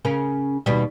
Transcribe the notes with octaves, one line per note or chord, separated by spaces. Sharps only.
C#3 C#4 A#4
D#2 B2 G3